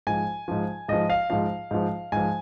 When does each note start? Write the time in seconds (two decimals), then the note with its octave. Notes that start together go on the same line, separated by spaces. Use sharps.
0.07 G#2 F3 G#5
0.48 G#2 F3
0.88 G#2 F3 D#5
1.10 F5
1.30 G#2 F3 F5
1.71 G#2 F3
2.12 G#2 F3 G#5